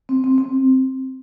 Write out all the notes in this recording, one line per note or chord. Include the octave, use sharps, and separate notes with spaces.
C4
C4
C4